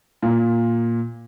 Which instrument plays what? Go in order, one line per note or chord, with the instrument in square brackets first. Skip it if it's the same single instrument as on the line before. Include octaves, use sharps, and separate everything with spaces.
[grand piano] A#2